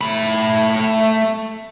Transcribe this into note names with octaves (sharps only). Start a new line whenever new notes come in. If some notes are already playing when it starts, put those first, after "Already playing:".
A3 B5